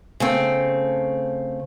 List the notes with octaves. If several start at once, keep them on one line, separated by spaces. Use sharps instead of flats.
C#3 A3 C4